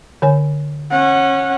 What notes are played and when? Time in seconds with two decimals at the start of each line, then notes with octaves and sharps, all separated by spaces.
0.22 D3 C#5 G#5
0.91 C#4 F#5